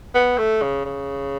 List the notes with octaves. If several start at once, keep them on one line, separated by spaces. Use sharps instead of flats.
B3
A3
C#3
C#3